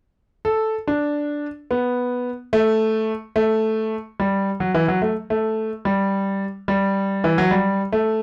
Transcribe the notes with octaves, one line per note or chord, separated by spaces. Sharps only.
A4
D4
B3
A3
A3
G3
F#3
E3
F#3
A3
A3
G3
G3
E3
F#3
G3
A3